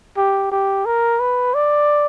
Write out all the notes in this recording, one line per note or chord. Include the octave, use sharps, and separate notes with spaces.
G4
G4
A#4
B4
D5